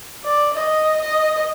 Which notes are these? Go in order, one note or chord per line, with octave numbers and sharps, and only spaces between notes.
D5
D#5
D#5